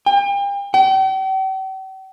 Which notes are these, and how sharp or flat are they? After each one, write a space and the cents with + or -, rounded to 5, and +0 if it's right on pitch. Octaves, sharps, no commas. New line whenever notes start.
G5 +40
G5 -45